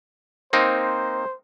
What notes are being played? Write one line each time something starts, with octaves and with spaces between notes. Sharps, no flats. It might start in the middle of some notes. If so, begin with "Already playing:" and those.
A#3 C4 D#4 C5